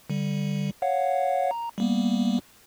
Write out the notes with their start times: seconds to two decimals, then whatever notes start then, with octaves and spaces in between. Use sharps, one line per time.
0.10 D3 G3
0.82 C#5 F5 F#5
1.51 A#5
1.78 G3 A#3 B3